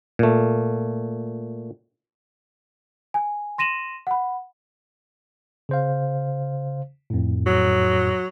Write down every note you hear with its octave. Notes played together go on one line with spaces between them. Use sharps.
A#2 A3
G#5
C6 A#6 D#7 E7 F#7
F#5 B5
C#3 C5 F5
F2 A2
F#3